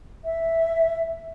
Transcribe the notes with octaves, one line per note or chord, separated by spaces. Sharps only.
E5